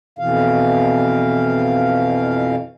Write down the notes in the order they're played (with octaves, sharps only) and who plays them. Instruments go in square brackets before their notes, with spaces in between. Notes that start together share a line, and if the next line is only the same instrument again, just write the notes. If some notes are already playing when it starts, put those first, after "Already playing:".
[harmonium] F2 B2 E3 F5